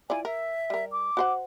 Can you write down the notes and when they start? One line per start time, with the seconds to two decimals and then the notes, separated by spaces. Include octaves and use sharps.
0.10 E4 F4 D5 G#5
0.25 A#4 E5
0.70 G3 A#4
0.92 D6
1.17 F#4 C5 F#5